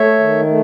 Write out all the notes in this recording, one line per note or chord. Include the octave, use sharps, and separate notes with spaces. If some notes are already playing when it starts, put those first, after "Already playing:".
Already playing: A3 C#5 E5
D#3
A3